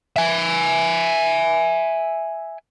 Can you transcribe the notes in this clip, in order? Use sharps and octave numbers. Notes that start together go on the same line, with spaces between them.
E5 G#5